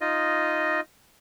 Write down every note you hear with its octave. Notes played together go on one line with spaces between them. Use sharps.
D#4 F4 D#5